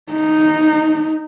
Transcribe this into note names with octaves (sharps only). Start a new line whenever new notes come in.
D#4